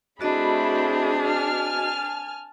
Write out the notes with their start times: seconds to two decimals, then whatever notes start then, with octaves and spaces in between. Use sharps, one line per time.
0.21 A3 C4 D4 E4 F#4 G#4 D#5 B5
1.28 G#5 A5 F6